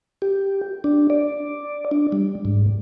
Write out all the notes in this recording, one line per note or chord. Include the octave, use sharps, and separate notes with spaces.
G4
D4
D5
D4
G3
G#2